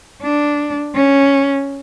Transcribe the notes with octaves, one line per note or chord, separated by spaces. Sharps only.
D4
C#4